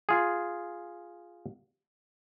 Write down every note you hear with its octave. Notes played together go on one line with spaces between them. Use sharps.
F4 G#4